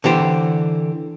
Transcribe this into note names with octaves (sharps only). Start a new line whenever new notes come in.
D3 E3 G4 C5